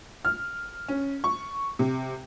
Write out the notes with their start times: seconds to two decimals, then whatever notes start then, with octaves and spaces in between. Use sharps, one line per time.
0.25 F6
0.88 C#4
1.24 C#6
1.79 C3